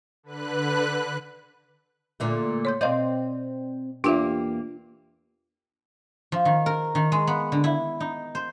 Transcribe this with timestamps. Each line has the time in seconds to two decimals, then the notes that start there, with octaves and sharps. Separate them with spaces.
0.23 D3 B4 F#6
2.20 A#2 D3 A3
2.65 C#5 C6 G6
2.81 B2 C4 D5 D#5 F5 G6
4.04 E2 A#3 D4 F4 G4 E5
6.32 F3
6.45 D#3
6.66 A#4
6.95 D#3
7.12 G#3
7.27 B3
7.52 D3
7.64 E4
8.00 D#4
8.35 C5